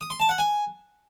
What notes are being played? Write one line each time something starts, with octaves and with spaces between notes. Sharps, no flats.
D#6
C6
A5
F#5
G#5